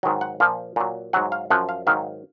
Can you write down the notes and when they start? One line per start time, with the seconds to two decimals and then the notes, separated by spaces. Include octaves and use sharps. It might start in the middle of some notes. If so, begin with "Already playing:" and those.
0.03 G#2 D#3 F#3
0.21 F#5
0.40 A#2 F3 F5
0.76 A#2 F#3
1.13 G#2 F#3 F#5
1.32 F5
1.50 F#2 F3 F#5
1.69 F5
1.87 G#2 D#3 F#3 F5